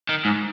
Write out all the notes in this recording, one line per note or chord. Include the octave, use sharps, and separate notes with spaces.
D#3
G#2